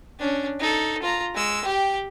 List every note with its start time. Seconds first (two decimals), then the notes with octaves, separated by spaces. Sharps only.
0.19 C#4 D4
0.59 D#4 A4
1.02 F4 A#5
1.35 G#3 E6
1.65 G4 G5